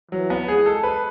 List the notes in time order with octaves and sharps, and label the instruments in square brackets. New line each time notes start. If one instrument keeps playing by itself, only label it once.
[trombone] E3 [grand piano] F#3
[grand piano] B3
[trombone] G#3 [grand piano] G#4
[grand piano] A4
B4